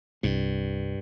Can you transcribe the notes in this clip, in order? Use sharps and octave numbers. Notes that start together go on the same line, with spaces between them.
C2 G2